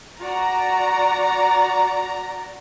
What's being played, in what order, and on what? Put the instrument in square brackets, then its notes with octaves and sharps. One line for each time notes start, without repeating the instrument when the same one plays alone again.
[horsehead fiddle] F#4 D5 [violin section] A#5